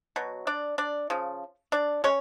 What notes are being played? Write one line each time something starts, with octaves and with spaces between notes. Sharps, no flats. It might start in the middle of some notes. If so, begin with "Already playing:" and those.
B2 F#3
D4 D5
D4 D5
C#3 F3
D4 D5
G#3 C#4 C#5